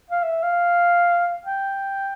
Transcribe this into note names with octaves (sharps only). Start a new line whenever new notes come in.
F5
E5
F5
G5